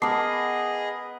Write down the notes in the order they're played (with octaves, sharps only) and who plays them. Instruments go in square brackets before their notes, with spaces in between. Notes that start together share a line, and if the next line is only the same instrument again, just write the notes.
[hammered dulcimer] B3 A#4 [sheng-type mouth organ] G#4 D#5 [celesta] A5 D6 C7